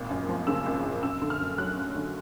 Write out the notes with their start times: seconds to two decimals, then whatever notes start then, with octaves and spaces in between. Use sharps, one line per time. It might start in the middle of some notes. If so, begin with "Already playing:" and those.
Already playing: G#1 A#2
0.10 F#2
0.29 F3
0.47 C#3 E6
0.66 G#1
0.85 F#2
1.03 F#2 E6
1.22 D3
1.30 F6
1.40 F#2
1.58 F#3 F#6
1.77 F#2
1.95 D3